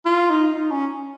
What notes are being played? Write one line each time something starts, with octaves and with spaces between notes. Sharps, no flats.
F4
D#4
D#4
C#4